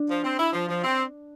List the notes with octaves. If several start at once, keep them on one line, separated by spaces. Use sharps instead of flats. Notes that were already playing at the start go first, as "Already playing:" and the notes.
Already playing: D4
F3
C4
E4
F3
F3
C4